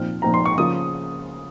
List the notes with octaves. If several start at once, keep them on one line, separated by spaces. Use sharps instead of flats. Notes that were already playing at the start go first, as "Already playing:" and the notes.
Already playing: A#2 F3 C4 D#4 F6
A#2 F3 C4 D#4 A#5
C6
C#6
C#3 F3 A#3 F4 D#6